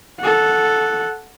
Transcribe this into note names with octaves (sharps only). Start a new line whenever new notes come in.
A4 F#5